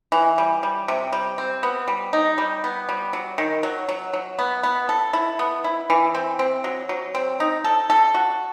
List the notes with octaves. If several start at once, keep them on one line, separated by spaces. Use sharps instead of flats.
E3
G3
G3
C3
G3
C4
B3
G3
D#4
G3
B3
G3
F#3
D#3
F#3
F#3
F#3
B3
B3
A4
E4
B3
E4
E3
C4
C4
F#3
F#3
C4
D#4
A4
A4
F#4